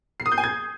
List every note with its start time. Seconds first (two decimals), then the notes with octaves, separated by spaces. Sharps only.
0.20 C7
0.26 D#6
0.32 G6
0.38 G#5
0.44 G#6